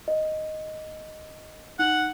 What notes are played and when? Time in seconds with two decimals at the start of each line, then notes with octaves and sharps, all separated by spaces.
0.08 D#5
1.79 D#4 F#5 F#7